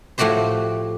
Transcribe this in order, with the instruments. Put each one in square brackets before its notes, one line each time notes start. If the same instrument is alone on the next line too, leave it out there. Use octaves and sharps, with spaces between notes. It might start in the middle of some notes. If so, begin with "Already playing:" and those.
[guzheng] A2 F3 A3 F#4 G4 C5